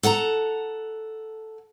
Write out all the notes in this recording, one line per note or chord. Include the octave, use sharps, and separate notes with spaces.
A4 F#5 A5 A#5